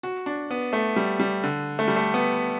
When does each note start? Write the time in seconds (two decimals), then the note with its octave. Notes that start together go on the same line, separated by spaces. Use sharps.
0.03 F#4
0.26 D4
0.51 B3
0.73 A3
0.96 G3
1.20 G3
1.44 D3
1.79 A3
1.88 G3
1.96 A3
2.14 B3